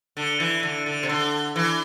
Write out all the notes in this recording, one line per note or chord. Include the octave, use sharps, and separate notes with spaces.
D3
E3
D3
D3
C3
D3
E3